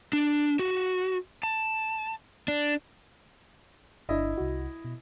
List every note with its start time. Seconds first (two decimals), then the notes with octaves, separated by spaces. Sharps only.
0.13 D4
0.59 F#4
1.43 A5
2.48 D4
4.09 G1 D4 E4 D#5
4.38 C2 F#4
4.85 B2